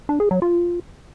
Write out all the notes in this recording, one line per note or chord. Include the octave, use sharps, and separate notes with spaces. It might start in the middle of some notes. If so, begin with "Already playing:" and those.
D4
G#4
F#3
F4